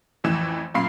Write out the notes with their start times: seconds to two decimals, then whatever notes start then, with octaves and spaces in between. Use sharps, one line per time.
0.24 A1 F2 E3 E7
0.74 F#2 A#2 F5 B5 C7